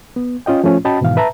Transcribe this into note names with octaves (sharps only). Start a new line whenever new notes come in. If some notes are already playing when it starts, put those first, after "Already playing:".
B3
C#4 F4 D#5 G5
F3 A3 C#4 F4
C#4 F#4 D#5 G5 A5 B5
G#2 B2 D#3 E3 F5
B4 E5 A5 A#5